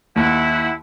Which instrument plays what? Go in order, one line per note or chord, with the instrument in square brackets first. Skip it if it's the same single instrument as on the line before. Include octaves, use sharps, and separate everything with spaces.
[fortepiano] D#2 [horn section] E4 F#5